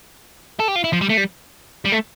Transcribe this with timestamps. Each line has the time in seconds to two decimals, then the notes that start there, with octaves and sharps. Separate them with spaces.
0.60 A4
0.68 G4
0.75 F4
0.84 E4
0.93 F3
1.01 G3
1.09 A3
1.17 G3
1.85 G3
1.92 A3